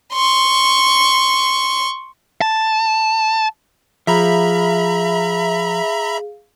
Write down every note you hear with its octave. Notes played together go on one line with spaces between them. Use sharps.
C6 C#6
A5
F3 G#4 E5 F5 A#5 B5